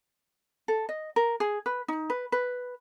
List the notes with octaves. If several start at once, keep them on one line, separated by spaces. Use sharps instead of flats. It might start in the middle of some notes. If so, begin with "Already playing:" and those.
A4
D#5
A#4
G#4
B4
D#4
B4
B4